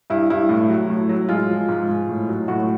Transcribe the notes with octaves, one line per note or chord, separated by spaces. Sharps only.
G2 E4
G2 E4
A2
F#3
A2
F#3
G#3 F4
F3
G#2
G#2
A2
F#3
A2 F#4